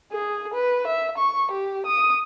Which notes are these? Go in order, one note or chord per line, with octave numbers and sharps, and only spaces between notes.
G#4
B4
E5
C#6
G4
D#6